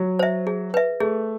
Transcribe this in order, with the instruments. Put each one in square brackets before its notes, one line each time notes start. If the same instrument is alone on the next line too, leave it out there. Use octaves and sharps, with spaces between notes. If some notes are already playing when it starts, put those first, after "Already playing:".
Already playing: [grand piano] F#3
[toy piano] C5 E5
G#4
B4 E5
[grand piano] A3 [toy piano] G#4